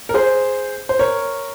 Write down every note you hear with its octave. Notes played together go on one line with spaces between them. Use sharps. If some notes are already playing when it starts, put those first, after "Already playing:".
A#4
G#4 C5
C5
A#4 C#5